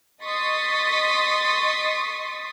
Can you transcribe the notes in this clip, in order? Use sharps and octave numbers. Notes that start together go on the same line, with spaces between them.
D#5 C6 C#6 D#6 A6 B6